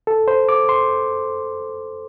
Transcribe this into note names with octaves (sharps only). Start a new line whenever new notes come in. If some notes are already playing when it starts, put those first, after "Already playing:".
A4
C5
D6
C6